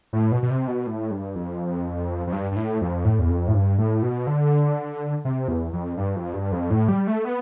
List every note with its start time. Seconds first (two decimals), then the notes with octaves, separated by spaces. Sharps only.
0.13 A2
0.32 B2
0.43 B2
0.50 C3
0.67 B2
0.87 A2
1.11 G2
1.35 F2
2.27 F2
2.33 G2
2.52 G2
2.56 A2
2.81 F2
3.05 A2
3.19 E2
3.30 F2
3.48 A2
3.54 G2
3.78 A2
4.03 B2
4.27 D3
5.25 C3
5.48 E2
5.73 F2
5.97 G2
6.16 F2
6.34 G2
6.52 F2
6.71 A2
6.89 G3
7.07 A3
7.25 B3